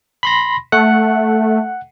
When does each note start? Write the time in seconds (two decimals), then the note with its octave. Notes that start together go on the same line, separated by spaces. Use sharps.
0.23 B5 C6 A#6
0.72 A3 F#5